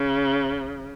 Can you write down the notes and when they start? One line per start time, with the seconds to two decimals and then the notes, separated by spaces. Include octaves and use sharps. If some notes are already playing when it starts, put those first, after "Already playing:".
Already playing: C#3